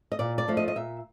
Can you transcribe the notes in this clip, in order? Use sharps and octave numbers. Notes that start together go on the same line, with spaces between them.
D#5
A#2 D5
D5
F3 A3 D4
D#5
D#5
A#2 E5